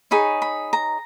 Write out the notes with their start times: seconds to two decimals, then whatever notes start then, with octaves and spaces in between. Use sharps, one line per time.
0.11 D#4 G#4 C#5 B5
0.42 B5
0.73 A#5